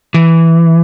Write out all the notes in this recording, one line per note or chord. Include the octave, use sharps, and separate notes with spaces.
E3